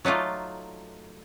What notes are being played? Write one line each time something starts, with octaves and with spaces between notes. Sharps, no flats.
F#3 A3 D#4 F4 D5